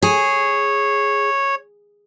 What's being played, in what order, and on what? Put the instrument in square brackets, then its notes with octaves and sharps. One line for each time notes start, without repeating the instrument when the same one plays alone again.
[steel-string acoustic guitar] G#4 [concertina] C#5